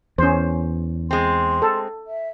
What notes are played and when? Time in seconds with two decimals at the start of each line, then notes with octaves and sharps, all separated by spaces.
0.18 E2 C#4 C5
1.11 G#3 C4 C6
1.62 A4
2.07 E5